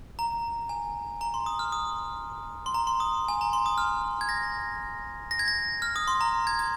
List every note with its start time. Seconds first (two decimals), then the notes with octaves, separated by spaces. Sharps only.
0.19 A#5
0.69 G#5
1.21 A#5
1.34 C6
1.46 D#6
1.59 F6
1.72 D#6
2.66 C6
2.74 A#5
2.87 C6
3.00 D#6
3.28 G#5
3.41 A#5
3.53 C6
3.66 D#6
3.78 F6
4.21 G#6
4.29 A#6
5.31 A#6
5.39 G#6
5.48 A#6
5.82 F6
5.96 D#6
6.08 C6
6.21 A#5
6.47 G#6
6.59 G#6